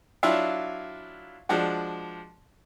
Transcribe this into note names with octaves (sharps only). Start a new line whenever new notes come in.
F#3 D4 E4 F4 E5 F5
F3 G#3 D4 F#4